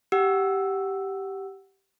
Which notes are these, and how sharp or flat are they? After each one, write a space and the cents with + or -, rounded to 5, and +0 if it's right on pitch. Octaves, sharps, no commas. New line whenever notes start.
G4 -10 F#5 +0 E6 +0